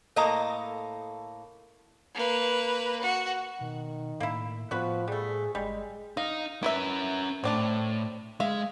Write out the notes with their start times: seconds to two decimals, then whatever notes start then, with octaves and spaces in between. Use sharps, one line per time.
0.16 A2 A#3 A4 D#5 A#5
2.14 A#3 B4
3.02 F#4
3.61 B2 D#3
4.20 A2 A#3 E4
4.71 A2 F3 B3 F#4 B4
5.08 G3 A3 G#4
5.55 G1 G3 G#3
6.17 D#4 F5
6.63 C#4 E4 A#4 B4 E5
7.44 A2 C4 D4 A5
8.40 G#3 E5 F5